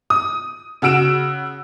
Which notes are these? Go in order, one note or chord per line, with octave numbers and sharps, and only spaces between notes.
D#6
C#3 F#4 E6 D7 E7